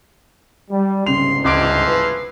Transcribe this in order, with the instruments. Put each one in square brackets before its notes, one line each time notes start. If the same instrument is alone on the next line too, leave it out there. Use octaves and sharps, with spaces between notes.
[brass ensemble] G3
[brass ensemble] G1 C2 G#2 [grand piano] C#3 F7 [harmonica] C6
[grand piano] C#2 D6 D7 [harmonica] E3 F3 C6
[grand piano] B4